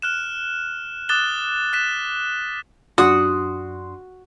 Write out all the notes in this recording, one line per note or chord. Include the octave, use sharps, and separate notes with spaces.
F6 F#6 E7
D6 D#6 F#6 A6 E7 G7
F#6 B6 E7
F#2 D4 F#4 C6 D#6